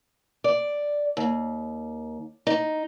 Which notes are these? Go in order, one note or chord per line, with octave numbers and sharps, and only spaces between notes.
D5
D#2
D#4